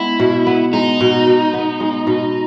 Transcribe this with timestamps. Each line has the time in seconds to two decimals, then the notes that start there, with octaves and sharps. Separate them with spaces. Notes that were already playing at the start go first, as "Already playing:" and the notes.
Already playing: G#3 B3 E4
0.20 B2
0.47 B3
0.73 G#3 D#4
1.01 B2
1.27 B2
1.54 B3
1.80 G#3
2.07 B2